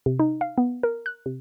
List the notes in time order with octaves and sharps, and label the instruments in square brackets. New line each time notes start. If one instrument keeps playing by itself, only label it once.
[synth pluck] C3
D#4
F5
B3
A#4
F#6
C3